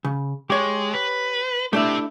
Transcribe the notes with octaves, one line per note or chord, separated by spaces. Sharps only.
C#3
G#3 G4 C#5
B4
A3 D4 E4 G4 E5